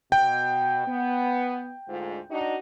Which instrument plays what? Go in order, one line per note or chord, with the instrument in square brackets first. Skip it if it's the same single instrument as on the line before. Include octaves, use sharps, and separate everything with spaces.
[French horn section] B2 [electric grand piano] G5
[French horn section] B3
D2 G#2 F4
D4 D#4 F#4